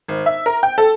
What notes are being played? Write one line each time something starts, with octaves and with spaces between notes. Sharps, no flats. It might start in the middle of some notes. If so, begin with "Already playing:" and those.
G#1
E5
A#4
G5
A4